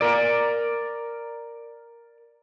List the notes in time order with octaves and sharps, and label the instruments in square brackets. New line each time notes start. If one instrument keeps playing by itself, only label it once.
[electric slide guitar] A#4 D5